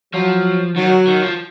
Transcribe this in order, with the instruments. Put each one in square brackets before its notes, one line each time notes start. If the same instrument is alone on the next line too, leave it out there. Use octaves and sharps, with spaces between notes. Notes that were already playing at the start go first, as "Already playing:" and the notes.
[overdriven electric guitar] F3 [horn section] F#3
[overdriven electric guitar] D#3 [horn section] F#3
[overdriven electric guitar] D#3
F3